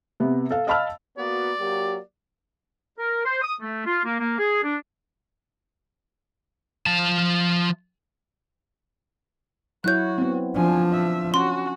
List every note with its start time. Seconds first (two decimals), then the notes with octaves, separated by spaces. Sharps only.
0.20 C3 B3
0.50 A4 F5
0.67 D#5 F5 A5 B5 E6 F6
1.17 A#3 B3 F#4 D5
1.60 F#3 A#3 G4
2.98 A#4
3.25 C5
3.42 D#6
3.62 A3
3.86 F4
4.05 A#3
4.20 A#3
4.39 G#4
4.63 D4
6.86 F3 A5
9.84 F#3 E4 F#4 C#5 F#6 G6
10.18 B3 C4
10.56 F3 D4 G#5
10.92 E5
11.34 C#4 F#4 C6